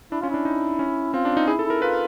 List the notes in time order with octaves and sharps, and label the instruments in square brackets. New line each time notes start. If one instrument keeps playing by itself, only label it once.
[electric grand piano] D4 [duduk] E4
[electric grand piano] C#4 [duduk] F4
[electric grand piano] D4 [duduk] E4
[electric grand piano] D#4
C#4
[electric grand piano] C4 [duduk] F4
[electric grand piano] D4
D#4
[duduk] E4 [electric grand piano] G#4
[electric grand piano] A4
[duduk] E4
[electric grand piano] A#4
[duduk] F4 [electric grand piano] B4